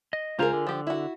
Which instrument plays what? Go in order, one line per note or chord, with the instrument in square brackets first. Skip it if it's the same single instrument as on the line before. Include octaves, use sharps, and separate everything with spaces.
[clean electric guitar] D#5
[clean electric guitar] C#2 C5 A#5 [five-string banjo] F4 G#4 A#4
[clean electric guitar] D3
[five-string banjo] F3 G4
E4 F#4